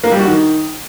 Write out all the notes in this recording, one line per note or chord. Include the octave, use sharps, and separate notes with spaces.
A#3
G3
F#4
D#3